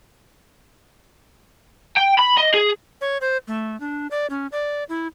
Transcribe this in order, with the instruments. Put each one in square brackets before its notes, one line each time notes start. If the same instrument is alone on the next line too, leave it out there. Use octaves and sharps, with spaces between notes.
[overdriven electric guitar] G5
B5
D#5
G#4
[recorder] C#5
C5
A3
D4
D5
C#4
D5
E4